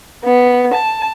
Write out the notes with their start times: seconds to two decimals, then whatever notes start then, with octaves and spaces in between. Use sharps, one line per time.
0.24 B3
0.74 A5